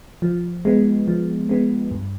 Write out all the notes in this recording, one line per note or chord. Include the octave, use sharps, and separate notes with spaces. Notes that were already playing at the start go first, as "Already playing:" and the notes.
F3
G#3 B3
F3
G#3 B3
G2